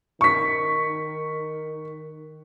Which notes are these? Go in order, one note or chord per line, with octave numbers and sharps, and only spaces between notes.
D#3 C#6 B6